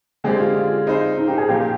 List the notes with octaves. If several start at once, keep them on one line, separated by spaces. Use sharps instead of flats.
D3 G#3 C4 G4 G#4 D5
F4
F4
C4 D#4 G#4 C5
D#4
G4
G#4
A#2 F3 A#3 F4 G4